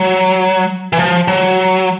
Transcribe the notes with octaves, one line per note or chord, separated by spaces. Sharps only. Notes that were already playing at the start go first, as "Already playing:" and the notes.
Already playing: F#3
E3
F3
F#3